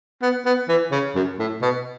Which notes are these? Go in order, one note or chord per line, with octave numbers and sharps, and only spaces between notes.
B3
B3
E3
C#3
F#2
A2
B2